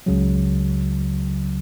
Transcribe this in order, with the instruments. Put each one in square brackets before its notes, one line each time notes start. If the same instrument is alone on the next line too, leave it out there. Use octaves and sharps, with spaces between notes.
[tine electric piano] C#2 C#3 F#3